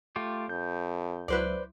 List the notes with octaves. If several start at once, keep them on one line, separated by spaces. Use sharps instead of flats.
A3 F4 G4
F2 G6
C#2 F#3 E4 B4 C5 D5